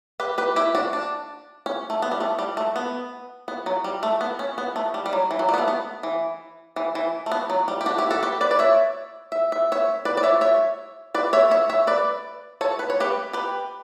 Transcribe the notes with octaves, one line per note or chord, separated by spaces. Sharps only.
G4 B4
G4 B4
E4 G4
D4 F#4
D4
C#4
A3
B3
G3
A3
G3
A3
B3
B3
F#3
G3
A3
B3
C#4
B3
A3
G3
G3
F#3
E3
F#3
G3
B3
A3
B3
E3
E3
E3
A3
B3
F#3
G3
G4
D4 F#4
E4 G4
F#4 A4
G4 B4
B4 D5
D5
C#5 E5
E5
E5
C#5 E5
B4 D5
D5
C#5 E5
C#5 E5
B4 D5
C#5 E5
C#5 E5
C#5 E5
B4 D5
A4 C#5
B4
C#5
G4 B4
G4 B4